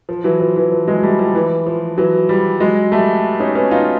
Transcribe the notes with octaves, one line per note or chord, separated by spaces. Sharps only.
F3
E3 F#3
F3
E3
F3
F#3 G#3
G3 A3
F3 G3
E3
F3
E3 F#3
F3 G3
F#3 G#3
G3 A3
C#4 D#4
B3 C#4
D#4 F4